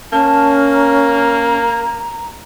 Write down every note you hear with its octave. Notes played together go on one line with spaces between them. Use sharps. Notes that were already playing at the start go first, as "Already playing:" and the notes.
A#3 C#4 A5
A#5